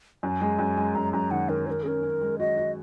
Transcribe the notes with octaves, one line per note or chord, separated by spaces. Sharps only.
F#2 G#5
G#3
F#2
G#3
F#2 A#5
F#2 A#5
D#3 F#5
D#3 A#4
D#3 A#4 C#5
C#4 G#4 A#4
C#4
G#3
F#4 D#5
F#4